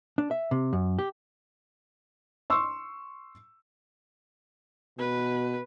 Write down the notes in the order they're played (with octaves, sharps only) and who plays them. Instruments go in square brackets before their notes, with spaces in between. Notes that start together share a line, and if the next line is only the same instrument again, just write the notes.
[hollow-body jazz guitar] D4
E5
C3
F#2
G4
[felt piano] C6 C#6 E6
[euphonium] B2 [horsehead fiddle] B4